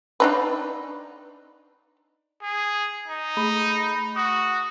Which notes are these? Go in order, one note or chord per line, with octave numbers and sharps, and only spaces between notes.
D4 D#4 B4
G#4
D#4
A3 G#4 B5
F#4 D#6